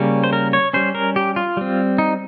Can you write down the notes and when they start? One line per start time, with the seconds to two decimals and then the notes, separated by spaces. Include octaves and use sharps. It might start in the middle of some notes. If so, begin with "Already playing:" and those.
Already playing: C#3 G3 A#3 C#4
0.24 C5
0.33 A#4
0.53 C#5
0.73 G3 C#4 C5
0.95 A#4
1.16 G4
1.36 F4
1.57 G3 C4
1.98 D#4